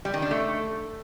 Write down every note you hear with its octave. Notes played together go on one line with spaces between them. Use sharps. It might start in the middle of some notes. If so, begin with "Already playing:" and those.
G3
D#3
D4
A3